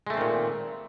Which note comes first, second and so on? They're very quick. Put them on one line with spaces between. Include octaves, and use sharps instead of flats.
G#3 A3 C4 D#3 A#2